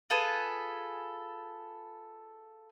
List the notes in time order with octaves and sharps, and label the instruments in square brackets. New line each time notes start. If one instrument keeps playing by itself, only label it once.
[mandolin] F4 G#4 A4 B4